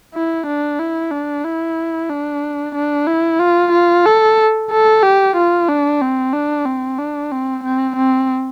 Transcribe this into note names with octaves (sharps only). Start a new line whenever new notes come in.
E4
D4
E4
D4
E4
D4
D4
E4
F4
F4
A4
A4
G4
F4
D4
C4
D4
C4
D4
C4
C4
C4